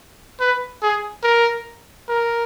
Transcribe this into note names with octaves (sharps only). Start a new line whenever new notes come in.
B4
G#4
A#4
A#4